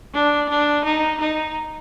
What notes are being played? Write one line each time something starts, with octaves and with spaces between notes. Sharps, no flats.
D4
D4
D#4
D#4